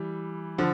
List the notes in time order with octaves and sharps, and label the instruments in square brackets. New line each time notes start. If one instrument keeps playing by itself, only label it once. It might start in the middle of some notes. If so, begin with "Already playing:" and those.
Already playing: [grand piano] E3 G3
D3 F3